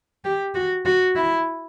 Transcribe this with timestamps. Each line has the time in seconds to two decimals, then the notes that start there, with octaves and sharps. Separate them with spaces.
0.24 G4
0.55 F#4
0.85 F#4
1.15 E4